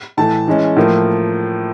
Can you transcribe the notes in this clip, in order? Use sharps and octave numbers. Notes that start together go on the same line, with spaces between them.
A2 E3 A3 A5
E3 G#3 C#4
A2 F3 A#3